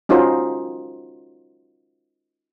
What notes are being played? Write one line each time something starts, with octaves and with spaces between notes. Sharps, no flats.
C#4 D#4 F4 F#4 C5